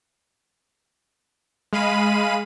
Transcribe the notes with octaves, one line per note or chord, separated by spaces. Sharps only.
G#3 F5 B5 D#7